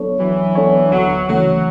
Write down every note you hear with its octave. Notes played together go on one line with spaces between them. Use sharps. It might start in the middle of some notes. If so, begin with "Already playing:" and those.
Already playing: F#3 B3 D4 A4 C#5
E3 F#3
B3 D4 A4 C#5
D2 F#3
C#3 E3 F#3 A3